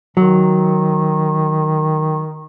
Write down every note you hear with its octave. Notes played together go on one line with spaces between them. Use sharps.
D#3 F#3